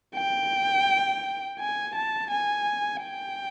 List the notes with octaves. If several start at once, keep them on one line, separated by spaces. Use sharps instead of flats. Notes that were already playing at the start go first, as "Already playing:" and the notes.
G5
G#5
A5
G#5
G5